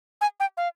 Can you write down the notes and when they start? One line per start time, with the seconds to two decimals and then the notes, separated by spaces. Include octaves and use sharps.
0.21 G#5
0.40 G5
0.57 F5